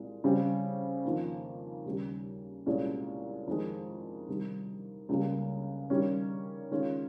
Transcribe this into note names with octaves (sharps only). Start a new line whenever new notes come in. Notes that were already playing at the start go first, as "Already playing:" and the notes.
Already playing: C2 A#2 G#3
C#3 G3 C4
F2 D#3 A#3 F4
D#2 C#3 G3
C2 A#2 G#3 C#4
F2 D#3 G#3
C3 D#3 G3
C#2 C#3 G3 A#3
D#3 G3 C#4
D#3 G#3 C#4 F4